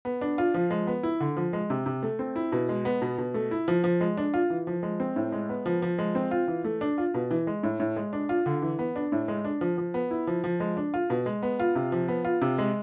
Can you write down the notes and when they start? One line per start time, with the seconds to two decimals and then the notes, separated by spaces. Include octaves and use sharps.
0.05 B3
0.21 D4
0.38 F4
0.54 F3
0.71 G#3
0.87 B3
1.03 E4
1.20 D3
1.37 F3
1.53 G#3
1.70 C3
1.86 C3
2.03 A3
2.19 C4
2.36 E4
2.52 B2
2.69 G#3
2.85 B3
3.02 B2
3.18 B2
3.34 A3
3.51 E4
3.68 F3
3.84 F3
4.01 G#3
4.17 D4
4.34 F4
4.50 E3
4.67 F3
4.83 G#3
5.00 C4
5.16 A2
5.32 G#3
5.49 B3
5.66 F3
5.82 F3
5.98 G#3
6.15 C4
6.31 F4
6.48 E3
6.64 A3
6.81 D4
6.98 F4
7.14 B2
7.31 E3
7.47 G#3
7.63 A2
7.80 A2
7.96 G#3
8.13 D4
8.29 F4
8.46 D3
8.62 E3
8.79 B3
8.96 D4
9.12 A2
9.28 G#3
9.45 D4
9.61 F3
9.78 F3
9.94 B3
10.11 E4
10.27 F3
10.44 F3
10.60 G#3
10.77 D4
10.94 F4
11.10 B2
11.26 G#3
11.43 B3
11.60 F4
11.75 C3
11.92 F3
12.08 B3
12.25 F4
12.41 C3
12.58 G#3